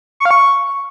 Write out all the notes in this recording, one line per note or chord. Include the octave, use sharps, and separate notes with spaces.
C#6
F5
C#6